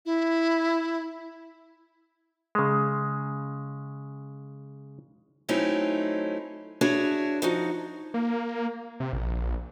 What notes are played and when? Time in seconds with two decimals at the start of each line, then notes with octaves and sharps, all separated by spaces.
0.06 E4
2.55 C#3 G#3
5.49 F#3 A3 C4 C#4 D#4 E4
6.81 D4 E4 F#4 G#4 C#5
7.42 F3 D#4 F#4
8.14 A#3
9.00 C3
9.13 A#1